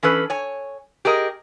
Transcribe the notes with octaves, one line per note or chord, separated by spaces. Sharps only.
E3 C#4 A4 B4
C#5 G#5
G4 G#4 A#4 D#5